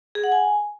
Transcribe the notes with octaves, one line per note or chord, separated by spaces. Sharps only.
G#4
F#5
G#5